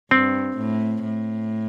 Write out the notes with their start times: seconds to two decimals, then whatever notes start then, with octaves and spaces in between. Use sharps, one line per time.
0.11 G2 C4
0.58 A2
1.04 A2